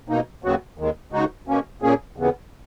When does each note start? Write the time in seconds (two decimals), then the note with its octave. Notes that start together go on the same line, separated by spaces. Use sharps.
0.08 B2 A#3 D#4
0.43 D#2 C#3 F#3 B3 F#4
0.78 D#2 D#3 G#3
1.12 C#3 G#3 D#4 F#4
1.47 B2 A#3 C#4
1.82 A#2 A#3 C#4 G#4
2.16 D#2 C#3 E3 B3